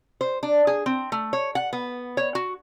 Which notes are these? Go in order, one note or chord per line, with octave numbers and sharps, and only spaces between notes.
C5
D4
G#4
C4
A3
C#5
F#5
B3
C#5
F#4